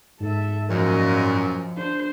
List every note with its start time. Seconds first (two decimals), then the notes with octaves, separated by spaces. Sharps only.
0.20 G#2 A4 E5
0.70 F#2 A#2 F3 A#4 D#5
1.77 D4 C5